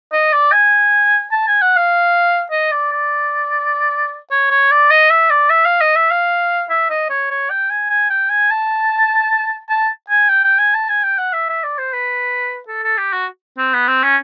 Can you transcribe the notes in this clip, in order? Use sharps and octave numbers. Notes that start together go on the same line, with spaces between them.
D#5
D5
G#5
A5
G#5
F#5
F5
D#5
D5
D5
C#5
C#5
D5
D#5
E5
D5
E5
F5
D#5
E5
F5
E5
D#5
C#5
C#5
G5
G#5
G#5
G5
G#5
A5
A5
G#5
G5
G5
G#5
A5
G#5
G5
F#5
E5
E5
D5
C5
B4
A4
A4
G4
F#4
C4
B3
C4
C#4